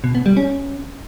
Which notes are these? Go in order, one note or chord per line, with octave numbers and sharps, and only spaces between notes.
B2
B3
G3
C#4